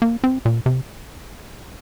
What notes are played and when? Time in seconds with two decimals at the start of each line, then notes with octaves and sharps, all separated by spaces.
0.02 A#3
0.24 C4
0.45 A#2
0.66 C3